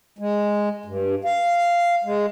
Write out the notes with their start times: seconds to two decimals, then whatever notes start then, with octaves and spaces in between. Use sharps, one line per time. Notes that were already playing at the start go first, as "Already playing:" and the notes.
0.19 G#3
0.85 G2
1.25 F5
2.04 G#3